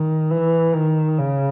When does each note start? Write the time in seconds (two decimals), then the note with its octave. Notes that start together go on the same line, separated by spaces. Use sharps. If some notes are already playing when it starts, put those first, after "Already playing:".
Already playing: D#3
0.31 E3
0.74 D#3
1.18 C#3